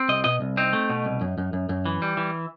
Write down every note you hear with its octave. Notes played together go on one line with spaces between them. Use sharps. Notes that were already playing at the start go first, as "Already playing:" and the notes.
Already playing: C4
C2 D#5
B2 D#5
C2
C4 D#4
A3
B2
C2
F#2
F#2
F#2
F#2
E3
G3
E3